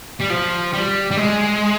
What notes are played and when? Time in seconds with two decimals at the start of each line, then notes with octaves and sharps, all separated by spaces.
0.20 G3
0.29 F3
0.73 G3
1.11 G3
1.17 G#3